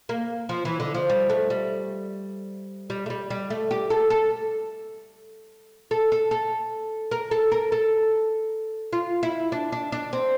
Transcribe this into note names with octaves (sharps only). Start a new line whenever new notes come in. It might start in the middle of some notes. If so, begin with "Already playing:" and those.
A#3
F3
E3
D3
F3
G3
A3
G3
G3
A3
G3
G3
A3
G4
A4
A4
A4
A4
A4
A#4
A4
A#4
A4
F4
E4
D4
D4
D4
C4